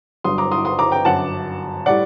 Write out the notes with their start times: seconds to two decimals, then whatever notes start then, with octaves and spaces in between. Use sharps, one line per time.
0.24 G1 G2 F#3 C6 D#6
0.38 A#5 D6
0.51 C6 D#6
0.65 C6 D#6
0.79 A#5 D6
0.92 G5 A#5
1.05 G1 F#2 F#3 F#5 A5
1.86 A2 G3 D5 F#5